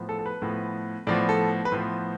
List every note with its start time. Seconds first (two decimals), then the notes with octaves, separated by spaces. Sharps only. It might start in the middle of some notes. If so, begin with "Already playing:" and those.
Already playing: A2 F3 B3
0.09 A4
0.19 A4
0.26 B4
0.42 A2 F3 B3
1.07 A2 F3 B3 D5
1.29 A4
1.65 B4
1.72 A2 F3 B3 C5